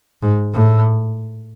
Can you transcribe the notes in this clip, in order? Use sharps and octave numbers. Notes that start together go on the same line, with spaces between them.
G#2
A2